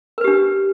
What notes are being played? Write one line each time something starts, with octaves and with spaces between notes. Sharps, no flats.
D4 G4 A#4 B4